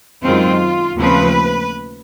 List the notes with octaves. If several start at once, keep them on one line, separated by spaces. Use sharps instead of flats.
F#2 D#3 G#3 C4 F4
D#2 C#3 F3 A3 C4 B4